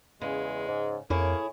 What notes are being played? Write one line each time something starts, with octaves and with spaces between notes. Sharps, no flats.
E2 C#3 G#3
G#2
F2 A2 A#3 E4 G#4 C#5